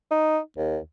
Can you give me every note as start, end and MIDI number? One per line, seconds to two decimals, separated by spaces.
0.11 0.39 63
0.57 0.78 39